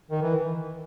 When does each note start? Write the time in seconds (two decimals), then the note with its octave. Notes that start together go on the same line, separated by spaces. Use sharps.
0.11 D#3
0.22 E3